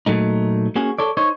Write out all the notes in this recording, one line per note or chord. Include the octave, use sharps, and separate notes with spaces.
A#2 F#3 A3 D#4
A#3 C#4 F#4 G#4
A4 C#5 D5
D#4 C5 C#5